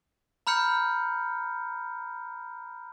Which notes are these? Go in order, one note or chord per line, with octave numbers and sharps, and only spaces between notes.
A#5 B5 F6 G6 C#7